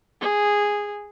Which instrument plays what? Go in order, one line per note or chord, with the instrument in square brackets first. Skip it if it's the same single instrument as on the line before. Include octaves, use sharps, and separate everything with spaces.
[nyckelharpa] G#4